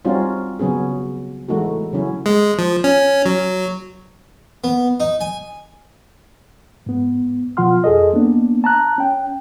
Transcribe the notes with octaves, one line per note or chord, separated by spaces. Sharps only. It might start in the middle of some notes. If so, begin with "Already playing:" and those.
G3 C4 C#4 D#4 F4 F#4
C#3 F#3 B3 C#4 G#4
E3 G#3 A3 D#4 F#4
C#3 F#3 C#4 E4
G#3
F3
C#4
F#3
B3
D#4
G#5
G#2 B3
B2 F3 F4 F#5 C6 F6
F2 G#4 A4 D#5
A#3 B3 D4
A5 A#5 F#6
C#4 G5